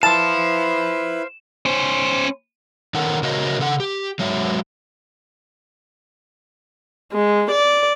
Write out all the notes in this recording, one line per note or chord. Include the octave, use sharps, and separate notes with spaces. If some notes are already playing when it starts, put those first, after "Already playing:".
E4 B4 C5 F5 A5 E7
C#4 C5
D#3 D#4 A4 A#4 C#5 F#5
C#3 F#4 A#4 C#5 D#5
C#3 A4 F#5
G4
F#3 G#3 C#5 E5
G#3
D5